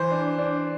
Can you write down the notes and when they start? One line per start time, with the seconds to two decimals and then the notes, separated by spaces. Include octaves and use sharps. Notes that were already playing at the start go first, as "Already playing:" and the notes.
Already playing: E3 C5
0.11 D4
0.39 D4